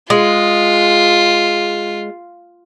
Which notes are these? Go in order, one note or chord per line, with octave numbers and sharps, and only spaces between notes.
G#3 F4